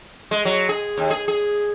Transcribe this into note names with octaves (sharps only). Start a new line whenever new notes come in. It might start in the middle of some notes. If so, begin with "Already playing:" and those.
G#3
F#3
G#4
D#2
G#4
G#4